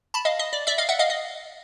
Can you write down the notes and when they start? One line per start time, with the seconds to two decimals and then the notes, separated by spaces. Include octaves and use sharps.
0.14 A5 B5
0.25 D#5 F5
0.39 D#5
0.53 D5
0.67 D5 E5
0.78 D#5 F5
0.89 E5 F#5
0.99 D#5 F5
1.10 D#5